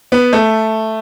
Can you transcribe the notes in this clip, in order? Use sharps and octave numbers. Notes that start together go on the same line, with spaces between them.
B3
A3